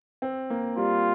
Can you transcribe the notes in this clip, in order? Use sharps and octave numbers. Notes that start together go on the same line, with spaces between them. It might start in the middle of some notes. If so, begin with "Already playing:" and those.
C4
A#3
G3 F4